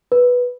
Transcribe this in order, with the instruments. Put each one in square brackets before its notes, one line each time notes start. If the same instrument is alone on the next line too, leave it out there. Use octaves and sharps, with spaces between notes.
[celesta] B4